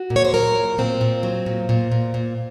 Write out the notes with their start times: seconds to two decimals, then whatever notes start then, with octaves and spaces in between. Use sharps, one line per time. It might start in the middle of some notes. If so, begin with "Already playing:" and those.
Already playing: F#4
0.10 A#2
0.16 C#5
0.25 C5
0.33 F#3 A#4
0.55 A#2
0.78 A#2 C4
1.01 A#2
1.23 F#3
1.46 A#2
1.69 A#2
1.92 A#2
2.14 A#2